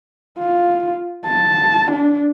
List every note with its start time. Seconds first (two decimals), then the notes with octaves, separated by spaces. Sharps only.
0.39 F4
1.26 A5
1.91 D4